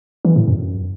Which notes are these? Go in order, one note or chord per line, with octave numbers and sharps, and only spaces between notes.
E3
A2
F#2